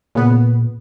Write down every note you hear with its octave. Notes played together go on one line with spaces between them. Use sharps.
A#2 C#3 B3